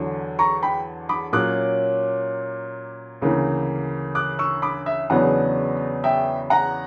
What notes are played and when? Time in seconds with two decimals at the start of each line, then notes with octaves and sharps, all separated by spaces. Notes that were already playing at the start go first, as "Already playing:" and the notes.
Already playing: E2 D3 F#3
0.39 A#5 C#6
0.62 G5 B5
1.09 B5 D6
1.33 A#2 F#3 C#4 D6 F#6
3.22 D2 C#3 E3 A#3
4.15 D6 F#6
4.39 C#6 E6
4.62 B5 D6
4.86 E5
5.10 E2 C#3 F#3 B3 D4 F#5
6.04 E5 G5
6.50 F#5 A#5